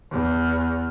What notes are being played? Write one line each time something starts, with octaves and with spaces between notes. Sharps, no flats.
E2